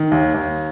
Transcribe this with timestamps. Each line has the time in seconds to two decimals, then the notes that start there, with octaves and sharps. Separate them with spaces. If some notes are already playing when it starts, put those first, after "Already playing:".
Already playing: D#3
0.12 D#2
0.34 D#2